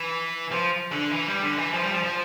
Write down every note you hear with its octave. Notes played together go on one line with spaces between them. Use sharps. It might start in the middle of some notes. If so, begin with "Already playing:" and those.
Already playing: E3
F3
D3
E3
G3
D3
E3
F3
G3
F3
F3